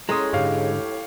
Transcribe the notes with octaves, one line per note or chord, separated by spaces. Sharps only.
A2 G#3 C#4 A#5 C6 D#6
G#2 D3 G4 C#5 F5